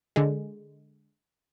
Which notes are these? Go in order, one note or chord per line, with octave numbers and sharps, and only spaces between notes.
D3 G#3